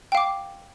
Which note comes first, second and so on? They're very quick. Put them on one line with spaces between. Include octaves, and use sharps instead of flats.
G5 F5 D6